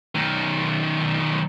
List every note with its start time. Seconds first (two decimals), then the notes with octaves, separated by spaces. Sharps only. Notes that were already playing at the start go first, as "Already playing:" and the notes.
0.15 B1 D#3